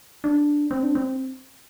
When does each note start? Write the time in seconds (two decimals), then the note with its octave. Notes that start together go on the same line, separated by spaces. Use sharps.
0.24 D4
0.71 C4
0.83 D4
0.95 C4